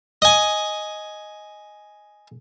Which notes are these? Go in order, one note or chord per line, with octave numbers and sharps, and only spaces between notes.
D#5 G#5